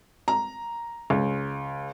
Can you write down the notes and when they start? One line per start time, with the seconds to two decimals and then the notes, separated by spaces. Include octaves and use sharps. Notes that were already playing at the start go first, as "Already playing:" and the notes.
0.28 A#5
1.10 C#2